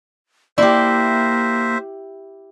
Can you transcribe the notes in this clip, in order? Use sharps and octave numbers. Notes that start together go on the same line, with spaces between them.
A#3 E4 G4 C5 D5 E5